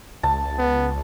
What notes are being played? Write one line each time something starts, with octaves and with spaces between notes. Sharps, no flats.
C#2 A5
B3